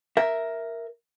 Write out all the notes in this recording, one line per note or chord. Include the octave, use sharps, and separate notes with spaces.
A#4 E5